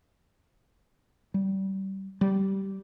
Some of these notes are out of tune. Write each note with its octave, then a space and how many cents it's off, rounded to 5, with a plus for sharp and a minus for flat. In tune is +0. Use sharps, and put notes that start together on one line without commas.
G3 -25
G3 -15